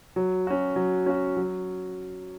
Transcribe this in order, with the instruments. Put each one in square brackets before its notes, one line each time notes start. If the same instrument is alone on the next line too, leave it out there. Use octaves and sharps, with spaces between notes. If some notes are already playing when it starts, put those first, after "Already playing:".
[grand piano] F#3
C#4 F#4
F#3
C#4 F#4
F#3